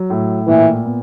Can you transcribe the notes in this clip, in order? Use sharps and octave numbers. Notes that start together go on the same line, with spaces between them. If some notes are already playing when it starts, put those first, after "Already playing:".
Already playing: F#3
A2
A#2 E3
B3